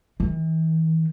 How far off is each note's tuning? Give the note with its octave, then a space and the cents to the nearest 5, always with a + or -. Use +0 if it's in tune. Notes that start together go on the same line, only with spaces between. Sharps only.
E3 -40